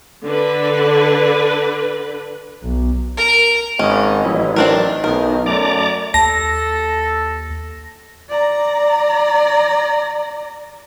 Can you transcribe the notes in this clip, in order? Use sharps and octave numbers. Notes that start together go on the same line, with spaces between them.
D3 B4
B1
A#4
G#1 C#4 D#5
A1 F#3 E4
D#3 C4 D4 A#4
B1 D#4 A#4
F#2 A3 D5 A#5 D6
D#2 A4 A5 A#6
D5 A#5